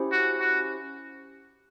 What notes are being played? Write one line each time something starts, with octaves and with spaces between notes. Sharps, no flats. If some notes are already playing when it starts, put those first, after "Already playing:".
Already playing: C#4 E4 G4 C5
F#4
F#4